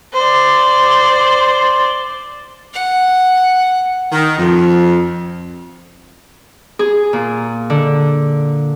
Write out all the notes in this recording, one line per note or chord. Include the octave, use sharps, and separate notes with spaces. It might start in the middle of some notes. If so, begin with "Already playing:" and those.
C5 D5
F#5
D#3
F2
G#4
A#2
D3